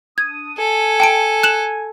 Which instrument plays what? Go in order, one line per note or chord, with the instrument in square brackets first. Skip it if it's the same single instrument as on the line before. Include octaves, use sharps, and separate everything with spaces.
[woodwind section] D4 D#6 [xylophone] G#6
[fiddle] A4 [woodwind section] G#5
[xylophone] G5 A5 D7
F#6 E7 F#7